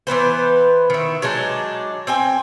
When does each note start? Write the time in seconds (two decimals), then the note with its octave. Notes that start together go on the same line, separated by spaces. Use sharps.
0.07 E3 B3 B4 C5
0.90 D#3 E4
1.22 F#3 G#3 D4 D#4
2.07 C4 G5 G#5